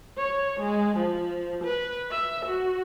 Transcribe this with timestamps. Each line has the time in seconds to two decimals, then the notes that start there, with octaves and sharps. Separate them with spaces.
0.17 C#5
0.60 G#3
0.97 F3
1.64 B4
2.11 E5
2.46 F#4